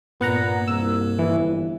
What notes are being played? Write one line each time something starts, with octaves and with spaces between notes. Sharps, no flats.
G2 A#2 A#3 B3 F#5 A#5
C2 E6
G1 E3